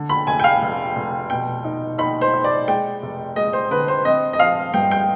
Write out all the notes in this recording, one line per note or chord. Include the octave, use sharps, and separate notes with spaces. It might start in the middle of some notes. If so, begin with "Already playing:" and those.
Already playing: D3
B5
F1 G#5
G5
F5
F1
F1
B2 G5
D#4
D#4 B5
C5
D#4
D5
G#3 G5
F1
G#3 D#5
C5
D3 B4
C5
C4 D#5
D#5
F3 F5
G2 G5
G5